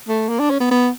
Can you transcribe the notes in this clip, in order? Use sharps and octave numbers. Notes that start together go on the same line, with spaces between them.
A3
A#3
D4
C#4
B3
B3